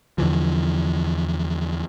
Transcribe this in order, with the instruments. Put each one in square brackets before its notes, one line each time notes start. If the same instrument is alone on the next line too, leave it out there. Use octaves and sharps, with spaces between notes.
[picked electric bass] E2 D3 E3 F3